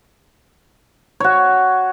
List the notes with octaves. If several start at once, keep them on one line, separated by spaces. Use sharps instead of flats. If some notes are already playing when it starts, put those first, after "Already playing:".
F#4 C#5